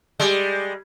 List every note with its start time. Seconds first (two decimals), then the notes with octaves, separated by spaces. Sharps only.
0.20 G3 G#3